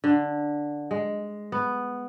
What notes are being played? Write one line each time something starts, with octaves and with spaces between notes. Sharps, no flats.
D3
G#3
B3